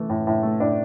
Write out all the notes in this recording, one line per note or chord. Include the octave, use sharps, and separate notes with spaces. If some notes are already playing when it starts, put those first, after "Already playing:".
Already playing: E3 A3
A2
A2
A3
A2 D4